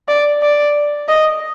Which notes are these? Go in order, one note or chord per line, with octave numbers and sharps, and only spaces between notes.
D5
D5
D#5